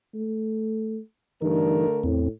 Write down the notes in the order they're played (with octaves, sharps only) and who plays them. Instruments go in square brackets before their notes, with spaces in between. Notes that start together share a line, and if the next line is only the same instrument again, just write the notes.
[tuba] A3
[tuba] G2 [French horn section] D3 A3 A#4 [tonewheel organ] E3 D#4
[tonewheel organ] E2 C4 [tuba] A2